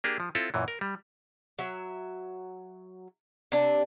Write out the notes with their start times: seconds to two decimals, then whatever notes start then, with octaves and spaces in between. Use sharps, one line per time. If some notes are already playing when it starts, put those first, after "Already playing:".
0.04 A#3 D4 G4 G#4
0.20 F3
0.35 C4 E4 F4 A4
0.54 F#2 A#2 E3
0.68 A#4
0.81 G3
1.59 F#3 E5
3.52 C3 D4